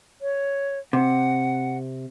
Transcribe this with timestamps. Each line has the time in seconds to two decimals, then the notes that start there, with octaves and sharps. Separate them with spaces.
0.21 C#5
0.93 C3 F#5